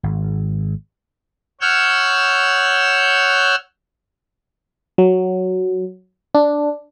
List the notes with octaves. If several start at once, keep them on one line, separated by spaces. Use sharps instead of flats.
G#1
C#5 F#5 E6 F6 G6
F#3
D4